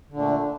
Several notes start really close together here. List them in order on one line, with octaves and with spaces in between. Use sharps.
D3 A#2 D4 A3